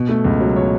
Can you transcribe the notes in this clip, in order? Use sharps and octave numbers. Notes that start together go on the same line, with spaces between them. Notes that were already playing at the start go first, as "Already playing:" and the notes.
Already playing: B2
A3
C#2
F#3
B2 C#5